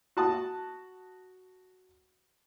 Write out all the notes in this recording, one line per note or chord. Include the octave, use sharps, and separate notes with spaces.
F#4 A5 D#6